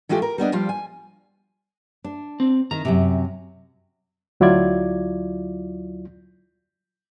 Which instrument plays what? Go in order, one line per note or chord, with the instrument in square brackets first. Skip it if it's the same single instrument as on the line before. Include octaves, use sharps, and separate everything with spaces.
[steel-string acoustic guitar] E3 G#3 A3 F4 G4
A#4
G3 B3 D4 D#5
F3 G3 F4
G#5
[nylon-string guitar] D4
[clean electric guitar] C4
[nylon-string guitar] D#3 [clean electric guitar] A#5
[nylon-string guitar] F#2 A2 C3
[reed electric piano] D2 F#3 E4 F4 D5 G#6